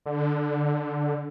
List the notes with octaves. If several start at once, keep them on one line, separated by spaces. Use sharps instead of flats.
D3